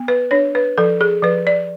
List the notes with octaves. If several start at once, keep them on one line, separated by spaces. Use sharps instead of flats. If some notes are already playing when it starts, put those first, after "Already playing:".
Already playing: B3
B4
D4 C#5
B4
F3 A4
G#4
F3 B4
D5